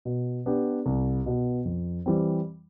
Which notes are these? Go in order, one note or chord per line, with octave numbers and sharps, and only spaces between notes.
B2
B3 D4 G4
C2
B2 B3
F2
E3 G3 C4